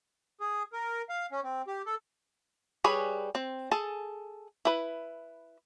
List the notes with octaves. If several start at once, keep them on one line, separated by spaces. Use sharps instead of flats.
G#4
A#4
F5
C#4
C4
G4
A4
G3 G#4 B4 C#5 B5
C4
G#4 A4 A5
E4 B4